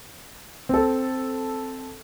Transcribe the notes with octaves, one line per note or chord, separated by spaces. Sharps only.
C4 A4